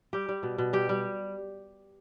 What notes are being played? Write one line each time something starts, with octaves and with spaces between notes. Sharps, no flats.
G3 G4
G3
B2
B2
G3 G4
G3